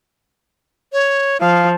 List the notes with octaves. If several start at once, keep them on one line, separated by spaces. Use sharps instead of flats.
C#5
F3 F5